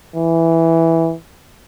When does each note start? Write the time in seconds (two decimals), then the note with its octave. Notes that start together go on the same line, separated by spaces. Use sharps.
0.16 E3